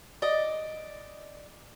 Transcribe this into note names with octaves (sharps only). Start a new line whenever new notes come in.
D5 D#5